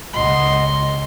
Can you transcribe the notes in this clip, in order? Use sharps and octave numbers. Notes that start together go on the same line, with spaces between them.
C#2 D#5 F#5 C6